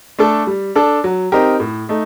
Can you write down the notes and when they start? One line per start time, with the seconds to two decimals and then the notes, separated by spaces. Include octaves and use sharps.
0.19 A3 D4 A4
0.47 G3
0.76 D4 A4
1.04 F#3
1.32 C4 D#4 G4 A#4
1.60 A2
1.89 A3 D#4